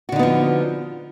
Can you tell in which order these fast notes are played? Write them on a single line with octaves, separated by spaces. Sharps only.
F#4 D3 D#4 B3 F3